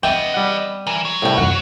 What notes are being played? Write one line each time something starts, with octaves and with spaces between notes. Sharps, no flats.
E3 B3 C4 D4 D#5 E5 G5
G3 F#5
E3 A#4
F#3
C2 A2 G3 G5
F#2 F4 F#5